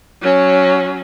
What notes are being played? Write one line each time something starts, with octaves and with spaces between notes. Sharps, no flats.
F#3 C#4